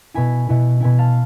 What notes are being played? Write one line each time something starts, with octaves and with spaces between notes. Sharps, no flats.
B2 B3 E4 G#5 B5
B2 B3 E4
B2 B3 E4 G#5 B5
F5 A5